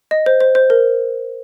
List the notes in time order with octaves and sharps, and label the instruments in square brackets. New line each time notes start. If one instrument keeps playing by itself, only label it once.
[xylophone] D#5
C5
C5
C5
A#4